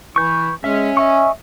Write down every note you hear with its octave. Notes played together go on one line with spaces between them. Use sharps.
E3 E4 C#6 G6
G#3 C#4 E5
D#5 E5 G#5 C#6